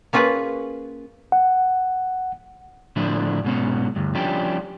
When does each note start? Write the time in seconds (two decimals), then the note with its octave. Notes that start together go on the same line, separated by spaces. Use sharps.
0.13 A#3 C#4 F4 G#4 B4
1.32 F#5
2.96 A2 D3 F3 D4 E4
3.44 G#2 B2 C#4
3.96 D2 G2
4.15 F3 G3 C#4 D4 G4